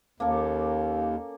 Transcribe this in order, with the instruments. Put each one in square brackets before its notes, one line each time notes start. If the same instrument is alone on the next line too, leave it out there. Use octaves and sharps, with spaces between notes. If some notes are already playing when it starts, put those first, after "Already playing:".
[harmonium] D#2 [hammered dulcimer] A#3 C#4 A4